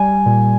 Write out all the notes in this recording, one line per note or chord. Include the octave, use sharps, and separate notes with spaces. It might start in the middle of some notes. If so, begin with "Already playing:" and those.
Already playing: G3 G#5
A#2